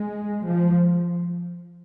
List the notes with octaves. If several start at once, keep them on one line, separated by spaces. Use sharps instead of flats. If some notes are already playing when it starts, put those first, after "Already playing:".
Already playing: G#3
F3